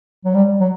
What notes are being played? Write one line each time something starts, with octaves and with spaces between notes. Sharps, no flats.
F#3
G3
F#3